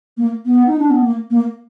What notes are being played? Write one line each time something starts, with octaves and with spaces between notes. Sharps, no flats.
A#3
B3
D#4
D4
B3
A#3
A#3